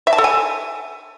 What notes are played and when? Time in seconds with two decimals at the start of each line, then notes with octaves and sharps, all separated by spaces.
0.07 E5
0.13 A5
0.18 A4
0.24 G#5